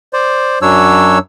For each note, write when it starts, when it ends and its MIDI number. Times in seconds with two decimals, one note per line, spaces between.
0.13 0.59 72
0.13 0.59 74
0.62 1.18 42
0.62 1.18 54
0.62 1.18 62
0.62 1.18 73
0.62 1.18 88